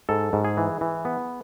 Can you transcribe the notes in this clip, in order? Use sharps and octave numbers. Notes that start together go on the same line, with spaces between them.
G#2 A4
G#2
G#4
E3
E3
B3